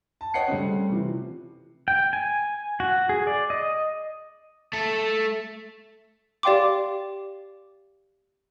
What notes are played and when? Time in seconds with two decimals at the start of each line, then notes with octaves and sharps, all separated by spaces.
0.21 A5
0.34 C#5 D#5 F#5 G5 C7 C#7
0.48 C#3 G3 A3 C4 C#4
0.90 C3 E3 F3
1.88 G5
2.13 G#5
2.80 F#4
3.09 G#4
3.27 D5
3.50 D#5
4.73 A3 A4
6.43 G4 D5 F5 G5 C6 D6